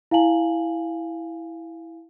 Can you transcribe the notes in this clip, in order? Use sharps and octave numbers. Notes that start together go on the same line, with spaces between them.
E4 F5 G#5 A5 F#7